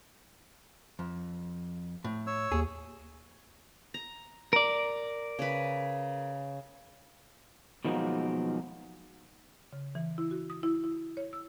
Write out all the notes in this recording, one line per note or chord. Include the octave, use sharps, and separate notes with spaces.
F2
A2
C#5 E6
D#2 G#4
A#5
A#4 D5
C#3 B4
B2 D#3 F3 F#3 G#3 A#3
C#3
E3
E4
F#4
D#6
E4
E4
C#5
E6